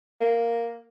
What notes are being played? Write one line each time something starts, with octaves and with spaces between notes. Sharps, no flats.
A#3